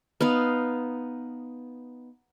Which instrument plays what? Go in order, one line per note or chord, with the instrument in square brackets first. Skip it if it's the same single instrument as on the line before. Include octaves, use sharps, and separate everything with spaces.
[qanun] B3 D#4 F5